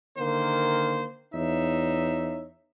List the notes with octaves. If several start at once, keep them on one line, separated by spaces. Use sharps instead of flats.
D3 D#3 A#3 C5
E2 D#4 C#5 E5